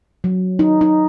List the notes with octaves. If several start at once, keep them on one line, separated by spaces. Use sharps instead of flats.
F#3
D#4
D#4